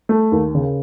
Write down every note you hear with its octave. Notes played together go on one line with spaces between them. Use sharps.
A3
D#2
C#3